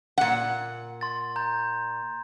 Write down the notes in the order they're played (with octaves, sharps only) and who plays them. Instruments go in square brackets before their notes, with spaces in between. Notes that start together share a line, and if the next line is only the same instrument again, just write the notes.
[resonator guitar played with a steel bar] A#2 F#5
[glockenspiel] C6 A6
A#5 G6